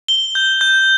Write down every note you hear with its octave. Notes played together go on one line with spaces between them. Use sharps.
G7
G6
G6